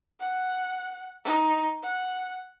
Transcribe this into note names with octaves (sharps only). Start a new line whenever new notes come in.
F#5
D#4
F#5